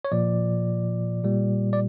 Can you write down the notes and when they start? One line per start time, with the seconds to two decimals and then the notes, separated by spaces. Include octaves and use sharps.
0.05 C#5
0.12 A#2 F3 D5
1.24 A#2 G3
1.73 D5